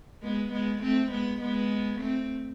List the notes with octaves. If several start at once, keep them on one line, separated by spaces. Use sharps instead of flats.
G#3 B3
G#3 B3
A3 C4
G#3 B3
G#3 B3
A3 C4